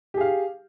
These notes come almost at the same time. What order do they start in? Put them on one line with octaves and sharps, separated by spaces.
G4 G#4 F5